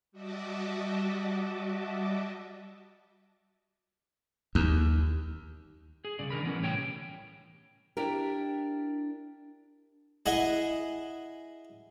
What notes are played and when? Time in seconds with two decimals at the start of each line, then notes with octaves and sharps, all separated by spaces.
0.12 G3 F#4 D#5 E5 A5 D6
4.55 D#2
6.05 G#4
6.19 C2 C#3 D5
6.30 D3 D#3 A#4 B5
6.43 E3 B3 C#4
6.61 C2 A2 G3 C#5 G5
7.97 D4 E4 G4 A#4
10.26 E4 G#4 D#5 F#5